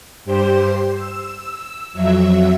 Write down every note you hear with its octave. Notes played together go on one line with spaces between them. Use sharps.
G2 G4 C5 C6
E6
F2 F#3 E5